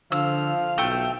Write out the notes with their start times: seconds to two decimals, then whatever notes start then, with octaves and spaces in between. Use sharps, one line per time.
0.12 D3 F3 F5 E6
0.78 B1 A3 G5 E6